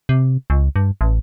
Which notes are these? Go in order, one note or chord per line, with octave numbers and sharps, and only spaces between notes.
C3
C#2
G2
A1